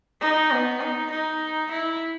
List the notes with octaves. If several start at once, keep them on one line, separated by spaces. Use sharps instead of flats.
D#4
B3
D#4
D#4
E4